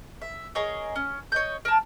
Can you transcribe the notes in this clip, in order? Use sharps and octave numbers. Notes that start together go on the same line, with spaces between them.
E5
G#4 A#4 C#5 D#5
C#4
C#5 D#5 G6
A#4 A5